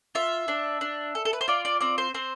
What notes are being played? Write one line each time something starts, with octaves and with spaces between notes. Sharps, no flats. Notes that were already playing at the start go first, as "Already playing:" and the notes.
F4 E5
D4
D4
A4
A4
B4
C5
F4 D5
D5
C4 D5
C5
C4 C5